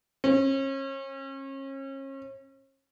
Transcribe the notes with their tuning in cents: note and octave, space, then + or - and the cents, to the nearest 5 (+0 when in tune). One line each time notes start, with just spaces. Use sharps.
C#4 -35